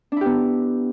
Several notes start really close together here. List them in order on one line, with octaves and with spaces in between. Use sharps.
D4 E4 G4 B3